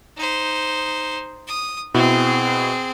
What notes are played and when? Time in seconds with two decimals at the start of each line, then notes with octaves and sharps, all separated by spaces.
0.17 D#4 C5
1.47 D#6
1.94 B2 C4 E4 G#4